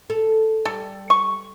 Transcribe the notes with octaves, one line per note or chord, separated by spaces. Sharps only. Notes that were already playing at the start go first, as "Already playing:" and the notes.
A4
G3 A4
C#6